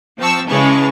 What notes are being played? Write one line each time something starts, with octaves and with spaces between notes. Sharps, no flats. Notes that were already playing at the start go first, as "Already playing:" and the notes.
F3 C4 A5 C#6 E6
C#3 E3 G#3 A5 C#6